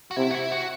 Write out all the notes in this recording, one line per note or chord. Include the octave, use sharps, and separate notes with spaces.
F#4
C3 E4
F#4
E4
F#4